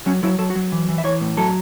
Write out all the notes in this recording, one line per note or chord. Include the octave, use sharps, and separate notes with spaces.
F#3 C#4
F#3 E4
F#3 A4
F#4
F#3
E3
E3
E5
E3 C#5
A2
F#3 A4